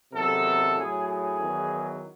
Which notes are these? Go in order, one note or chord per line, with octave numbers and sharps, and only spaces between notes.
E2 C3 D#3 F#3 A4
A2 F#3 G#4
G#4
E2 D#3 F#3